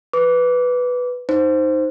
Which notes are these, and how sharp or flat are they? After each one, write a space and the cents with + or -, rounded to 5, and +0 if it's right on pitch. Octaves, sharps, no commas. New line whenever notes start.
B4 +0 D6 -25
D#4 +0 C5 +0